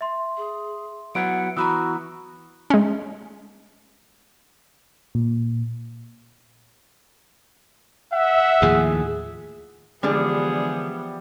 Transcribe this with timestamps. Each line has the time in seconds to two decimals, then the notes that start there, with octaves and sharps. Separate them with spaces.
0.01 E5 C6
0.37 G#4
1.15 F#3 B3 E4 F#5 D7
1.57 E3 B3 F#4 A#5 B5 E6
2.70 G#3 C#4
5.15 A#2
8.12 E5 F#5
8.62 D#2 A2 F3 G#4
10.03 D3 E3 F3 G3 G#3 B3 D4 G#4